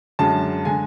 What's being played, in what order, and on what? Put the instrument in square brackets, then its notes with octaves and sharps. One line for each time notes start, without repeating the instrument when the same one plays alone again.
[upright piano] F#2 D3 G#3 A5
D3 G#3 G#5